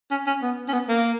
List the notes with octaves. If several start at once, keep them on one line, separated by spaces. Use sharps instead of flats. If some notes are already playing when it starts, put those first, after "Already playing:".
C#4
C#4
B3
C#4
B3
A#3